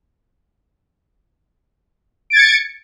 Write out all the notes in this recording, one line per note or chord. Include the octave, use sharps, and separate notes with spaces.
G#6 A6 C#7 D7